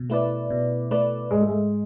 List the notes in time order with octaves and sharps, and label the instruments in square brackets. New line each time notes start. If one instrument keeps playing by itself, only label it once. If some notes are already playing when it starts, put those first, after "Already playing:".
Already playing: [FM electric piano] B2
A3 E4 B4 D5
B2
A3 E4 B4 D5
[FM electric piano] G#2 [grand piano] G#3
[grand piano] A3
G#3